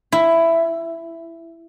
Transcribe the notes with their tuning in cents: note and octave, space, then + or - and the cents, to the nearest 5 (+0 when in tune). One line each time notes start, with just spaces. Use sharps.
E4 +10